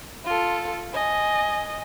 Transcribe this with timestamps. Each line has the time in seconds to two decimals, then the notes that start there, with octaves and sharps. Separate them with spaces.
0.25 F4 A4
0.92 D#5 G#5